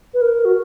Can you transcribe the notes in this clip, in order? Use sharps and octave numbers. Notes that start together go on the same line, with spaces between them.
B4
A#4
F#4